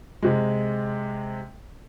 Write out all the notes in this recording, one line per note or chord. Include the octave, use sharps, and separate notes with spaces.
C3 G#3